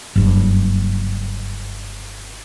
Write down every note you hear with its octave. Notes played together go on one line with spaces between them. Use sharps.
F#1 G2